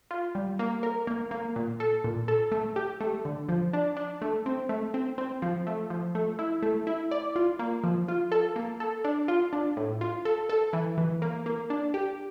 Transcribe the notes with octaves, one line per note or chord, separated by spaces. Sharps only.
F4
G3
A#3
A#4
A#3
A#3
A#2
A4
A#2
A4
A3
G4
A3
D3
F3
D4
D4
A3
C4
A3
C4
C4
F3
A3
F3
A3
E4
A3
E4
D5
F4
A#3
F3
F4
A4
A#3
A4
D4
F4
D4
A2
F4
A4
A4
E3
E3
A#3
A#3
D4
G4